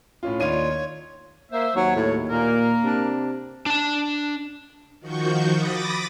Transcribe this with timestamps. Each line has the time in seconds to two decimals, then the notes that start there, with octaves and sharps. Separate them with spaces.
0.23 A2 C#4 F4
0.40 D#2 D4 D#4 F4 C#5 D#7
1.52 A#3 C5 E5
1.76 D#2 F#3 C#5
1.96 A2
2.30 A#2 A#3 A#4
2.84 C3 D4
3.66 D4 A5
5.00 D#3 F3 F#4 C#6 G6
5.53 B5 D6 D#6 A6 A#6